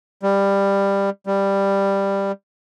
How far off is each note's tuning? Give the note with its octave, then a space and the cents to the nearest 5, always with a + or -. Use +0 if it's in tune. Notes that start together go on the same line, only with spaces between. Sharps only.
G3 +15
G3 +10